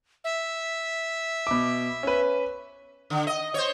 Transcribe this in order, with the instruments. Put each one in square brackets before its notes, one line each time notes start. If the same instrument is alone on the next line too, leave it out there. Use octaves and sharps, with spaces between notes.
[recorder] E5
[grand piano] B2 D6
C#4 B4
[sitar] D3
D#5
C5 C#5